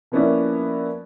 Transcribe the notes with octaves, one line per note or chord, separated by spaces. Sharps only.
F3 A#3 B3 C#4 E4 D5